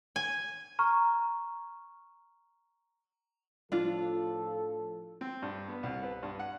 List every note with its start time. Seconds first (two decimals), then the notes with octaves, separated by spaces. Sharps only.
0.16 G#5
0.79 A#5 C#6 F6
3.72 A2 F3 D4 F4 A4
5.21 C4
5.42 G2
5.68 B3
5.83 C2
6.03 B4
6.23 G2
6.39 F#5